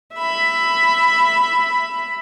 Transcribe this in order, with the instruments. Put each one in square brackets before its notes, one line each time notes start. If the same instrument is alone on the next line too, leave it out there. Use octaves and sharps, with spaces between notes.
[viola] E5 B5